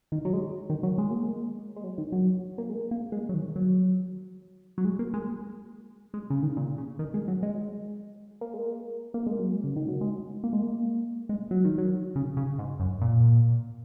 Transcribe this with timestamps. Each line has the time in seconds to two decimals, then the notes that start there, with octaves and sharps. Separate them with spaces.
0.12 D#3
0.25 F#3
0.33 G#3
0.70 D#3
0.83 F#3
0.98 G#3
1.11 A#3
1.23 G#3
1.76 G#3
1.84 F#3
1.98 D#3
2.12 F#3
2.58 A#3
2.70 G#3
2.91 A#3
3.12 G#3
3.29 F#3
3.34 D#3
3.56 F#3
4.78 F#3
4.85 G#3
4.99 A#3
5.14 G#3
6.14 G#3
6.30 C#3
6.43 D#3
6.57 A#2
6.78 C#3
6.99 D#3
7.14 G#3
7.28 F#3
7.43 G#3
8.41 A#3
8.54 G#3
8.66 A#3
9.14 A#3
9.27 G#3
9.39 F#3
9.51 G#3
9.64 C#3
9.76 D#3
9.88 F#3
10.01 G#3
10.44 A#3
10.53 G#3
10.63 A#3
11.29 G#3
11.51 F#3
11.65 D#3
11.78 F#3
12.15 C#3
12.37 C#3
12.58 G#2
12.80 F#2
13.02 A#2